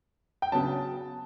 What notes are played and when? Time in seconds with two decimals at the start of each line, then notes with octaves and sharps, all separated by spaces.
0.42 G5
0.52 C#3 F#3 B3 D4 A5